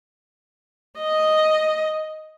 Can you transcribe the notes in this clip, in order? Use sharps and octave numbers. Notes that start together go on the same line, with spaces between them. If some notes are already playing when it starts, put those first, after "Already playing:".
D#5